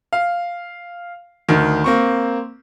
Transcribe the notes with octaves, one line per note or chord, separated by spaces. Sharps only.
F5
D2 D#3
A#3 C4 C#6